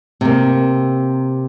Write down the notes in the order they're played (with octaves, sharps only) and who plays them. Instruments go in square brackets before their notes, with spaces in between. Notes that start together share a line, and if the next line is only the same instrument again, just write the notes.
[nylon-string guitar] C3 A#3